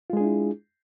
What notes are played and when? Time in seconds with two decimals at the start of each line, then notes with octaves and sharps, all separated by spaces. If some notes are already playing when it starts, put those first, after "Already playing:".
0.10 F4
0.13 G#3
0.17 G#4
0.20 D4
0.24 E4